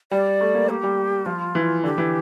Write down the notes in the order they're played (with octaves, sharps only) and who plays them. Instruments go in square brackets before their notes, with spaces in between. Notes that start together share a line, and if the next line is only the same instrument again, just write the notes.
[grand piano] G3 [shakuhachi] D5
[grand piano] A3
A#3
[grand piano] A#3 [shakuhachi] G4
[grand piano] G3
[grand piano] F3 [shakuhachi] F4
[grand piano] E3
[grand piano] D3 [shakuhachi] G4
[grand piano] E3